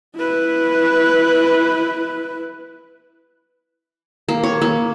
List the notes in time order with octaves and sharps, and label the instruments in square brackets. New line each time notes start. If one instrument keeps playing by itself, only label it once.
[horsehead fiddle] E4 B4
[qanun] A#3
C#5
A#3